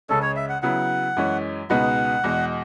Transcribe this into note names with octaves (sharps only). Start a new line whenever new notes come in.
C#2 C#3 G#3 C#4 A4
C#5
E5
F#5
C#3 F#3 B3 E4 F#5
F#2 E3 G#3 C#4
C#2 B2 G#3 B3 D#4 F#5
E2 B2 G#3